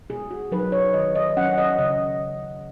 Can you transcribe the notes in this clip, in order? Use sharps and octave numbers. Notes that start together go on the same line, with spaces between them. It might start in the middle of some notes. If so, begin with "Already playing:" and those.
B2 G#4
F#4
F#3 D#4 B4
C#5
D#3 D#5
D#5
F#3 C#4 F#5
D#5
C#3 D#5